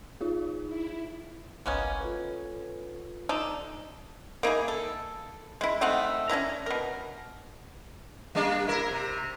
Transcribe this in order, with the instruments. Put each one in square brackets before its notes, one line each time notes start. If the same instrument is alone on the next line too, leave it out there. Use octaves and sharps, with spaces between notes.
[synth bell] D#4 F4 G#4
[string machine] E4
[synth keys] G1 C2 D#5 [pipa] A#3 B3 C#4
[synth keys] F4 A4 B4
[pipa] D4 D#4 A4
A#3 D#4 E4 G#4
A4
G#3 E4
A3 C4 D#4 F#5
C#4 D4 E4 A#5
B2 A#4
[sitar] G3 A#3 D4
E4 A#4
C3